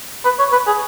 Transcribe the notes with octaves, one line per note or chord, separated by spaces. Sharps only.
B4
C#5
B4
G#4